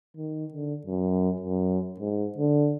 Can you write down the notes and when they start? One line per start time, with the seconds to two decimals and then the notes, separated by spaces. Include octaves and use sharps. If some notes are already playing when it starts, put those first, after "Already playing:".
0.17 D#3
0.53 D3
0.86 F#2
1.40 F#2
1.99 G#2
2.37 D3